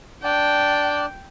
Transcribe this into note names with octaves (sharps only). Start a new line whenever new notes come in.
D4 D5 G5 A5